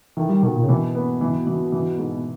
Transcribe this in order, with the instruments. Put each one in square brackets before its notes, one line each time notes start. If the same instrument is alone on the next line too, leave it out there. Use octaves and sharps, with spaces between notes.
[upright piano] D#3 [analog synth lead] E3
[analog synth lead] G3
[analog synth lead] B2 [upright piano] D#3
[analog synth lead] A#2
C#3
[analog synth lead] B2 [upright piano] E3
[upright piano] B3
E3
E3
E3
G#2